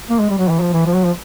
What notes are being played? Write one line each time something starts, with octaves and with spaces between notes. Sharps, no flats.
A#3
G#3
G3
F#3
E3
F3
E3
F3
F#3
F3